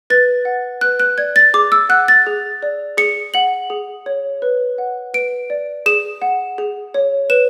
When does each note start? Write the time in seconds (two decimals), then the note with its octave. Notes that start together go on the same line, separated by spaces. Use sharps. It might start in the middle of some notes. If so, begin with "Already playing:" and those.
0.10 B4 A6
0.45 F#5
0.81 B4 F#6
1.00 F#6
1.18 D5 G#6
1.36 A6
1.54 G#4 D6
1.72 E6
1.89 F#5 F#6
2.08 A6
2.27 G#4
2.63 D5
2.97 G#4 C#7
3.34 F#5 F#7
3.70 G#4
4.06 C#5
4.42 B4
4.78 F#5
5.14 B4 D7
5.50 D5
5.86 G#4 E7
6.22 F#5
6.58 G#4
6.94 C#5
7.30 B4 E7